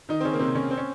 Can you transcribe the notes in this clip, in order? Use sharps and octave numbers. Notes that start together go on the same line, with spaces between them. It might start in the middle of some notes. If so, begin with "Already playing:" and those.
D#3 D#4
C4
C#3 C#4
A#3
C3 C4
C#3 C#4
C4
C#4